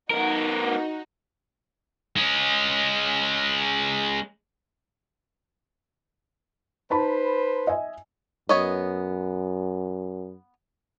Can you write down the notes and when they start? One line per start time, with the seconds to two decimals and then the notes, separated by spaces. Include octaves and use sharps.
0.10 B3 D#4 F#4 A#4
2.16 G#3 C#4
6.90 D#4 B4 C5 A5 B5
7.67 D#5 E5 G#5
8.49 F#2 B3 C#5 D#5